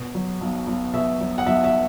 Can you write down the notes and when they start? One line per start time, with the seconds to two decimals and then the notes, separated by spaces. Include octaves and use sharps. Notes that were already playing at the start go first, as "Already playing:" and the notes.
Already playing: B2
0.14 F#3
0.41 B1
0.67 B1
0.93 B2 E5
1.20 F#3
1.38 F#5
1.46 B1 E5
1.64 E5